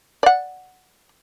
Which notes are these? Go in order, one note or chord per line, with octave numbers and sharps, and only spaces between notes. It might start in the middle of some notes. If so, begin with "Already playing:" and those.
D5 F#5